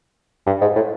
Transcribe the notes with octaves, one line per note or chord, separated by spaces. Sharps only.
G2
G#2
A2